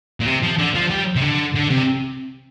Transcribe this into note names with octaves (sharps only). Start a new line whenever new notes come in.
A#2
C3
F3
D3
F3
G3
C3
D3
D3
C3